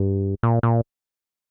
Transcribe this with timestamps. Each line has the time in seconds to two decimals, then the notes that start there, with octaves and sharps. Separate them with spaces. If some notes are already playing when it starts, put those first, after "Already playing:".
Already playing: G2
0.43 A#2
0.63 A#2